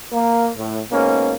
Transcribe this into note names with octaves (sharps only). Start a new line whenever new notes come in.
A#3
A2
G#2 B2 A#3 C#4